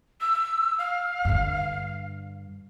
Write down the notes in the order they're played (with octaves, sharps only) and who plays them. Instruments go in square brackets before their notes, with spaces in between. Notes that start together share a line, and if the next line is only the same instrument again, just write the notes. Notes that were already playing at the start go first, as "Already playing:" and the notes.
[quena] E6
F5
[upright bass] G2 D3